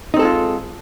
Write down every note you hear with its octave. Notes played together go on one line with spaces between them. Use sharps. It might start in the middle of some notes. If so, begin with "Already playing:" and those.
G#3 C4 D#4 F4 A4